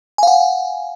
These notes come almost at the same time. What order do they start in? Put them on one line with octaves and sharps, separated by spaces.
G#5 F5 F#5